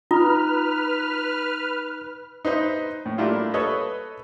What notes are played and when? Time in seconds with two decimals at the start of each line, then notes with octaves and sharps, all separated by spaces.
0.11 D#4 F4 B4 A#5 D#6 F6
2.45 D#4 B4 C5 D#5 E5
3.06 A2
3.18 G3 A3 A#3 D4 E4 F4
3.54 A4 B4 C#5 D#5